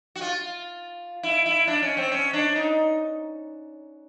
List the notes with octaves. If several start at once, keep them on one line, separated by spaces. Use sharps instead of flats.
F#4
F4
E4
E4
D4
C#4
C4
C#4
D4
D#4